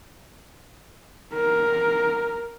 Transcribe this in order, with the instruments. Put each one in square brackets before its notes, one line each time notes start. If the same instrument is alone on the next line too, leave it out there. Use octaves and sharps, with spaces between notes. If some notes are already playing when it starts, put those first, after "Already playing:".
[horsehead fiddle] A#4